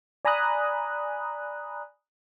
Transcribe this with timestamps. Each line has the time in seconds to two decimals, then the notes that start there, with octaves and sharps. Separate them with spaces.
0.25 D5 G#5 A#5 B5 D#6 F#6